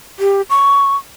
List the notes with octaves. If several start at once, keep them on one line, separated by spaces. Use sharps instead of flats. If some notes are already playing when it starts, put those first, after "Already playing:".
G4
C#6